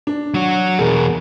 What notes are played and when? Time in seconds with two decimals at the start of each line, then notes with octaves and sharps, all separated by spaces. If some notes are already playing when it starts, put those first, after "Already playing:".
0.07 D4
0.34 F#3 F#4
0.79 E2 B2 G#4 A#4